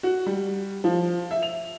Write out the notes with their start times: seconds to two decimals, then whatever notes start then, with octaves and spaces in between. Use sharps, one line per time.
0.03 F#4
0.26 G3
0.84 F3
1.31 E5
1.43 F7